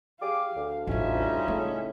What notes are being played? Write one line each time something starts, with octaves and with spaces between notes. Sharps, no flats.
G4 G#4 F5 D6
D2
A1 E2 G3 C#4 D#4 F4 E5
A2 C#3 A3